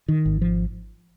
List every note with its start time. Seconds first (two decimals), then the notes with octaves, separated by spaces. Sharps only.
0.08 D#3
0.26 G#1
0.41 F3